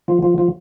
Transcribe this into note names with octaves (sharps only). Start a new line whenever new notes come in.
F3
F3
F3